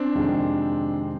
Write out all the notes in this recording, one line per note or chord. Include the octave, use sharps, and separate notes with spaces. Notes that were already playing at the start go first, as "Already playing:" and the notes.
Already playing: C4 D4
F2 C3 D#3 G#3